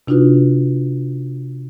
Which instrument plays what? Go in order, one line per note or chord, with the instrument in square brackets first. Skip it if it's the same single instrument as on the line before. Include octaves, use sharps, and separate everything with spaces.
[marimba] C3 D4 D#4 F4 F#4 B4